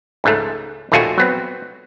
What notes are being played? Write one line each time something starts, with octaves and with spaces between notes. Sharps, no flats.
C#2 G#2 A3
A#1 D#2 A3 F4 F#4 G#5
F#3 B3 C4